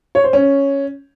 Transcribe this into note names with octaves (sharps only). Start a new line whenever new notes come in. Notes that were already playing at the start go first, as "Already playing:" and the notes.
C#5
C5
C#4